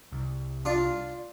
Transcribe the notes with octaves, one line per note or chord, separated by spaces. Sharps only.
C2
D4 F4